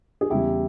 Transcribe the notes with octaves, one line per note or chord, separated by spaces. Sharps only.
G#4
E2 C#3 G3 E4 G4